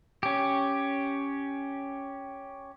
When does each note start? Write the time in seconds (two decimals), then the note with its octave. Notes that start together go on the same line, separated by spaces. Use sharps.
0.23 C#4 G4